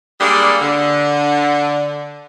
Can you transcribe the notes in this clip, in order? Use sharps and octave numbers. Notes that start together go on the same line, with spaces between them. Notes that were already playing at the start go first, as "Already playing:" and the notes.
G3 G#3 A#3 D4 G#4 A4
D3